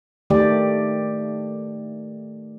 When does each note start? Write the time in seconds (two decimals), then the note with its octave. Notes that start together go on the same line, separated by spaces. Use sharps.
0.30 D#3 A3 G4 D5